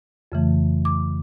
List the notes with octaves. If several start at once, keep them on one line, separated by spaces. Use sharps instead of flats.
F2 C#3 E3 A3
D6